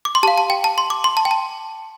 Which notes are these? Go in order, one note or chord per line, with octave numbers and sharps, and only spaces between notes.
D6
C6
G4 F5 A5
A5
G5
A5
C6
D6
C6
A5
G5
A5